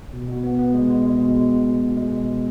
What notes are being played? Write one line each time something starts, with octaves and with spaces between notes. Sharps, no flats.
B2
B2
B3
B3
G#3
G#3
G#3
B2
G#3
B2
G#3
B2
G#3
G#3
B3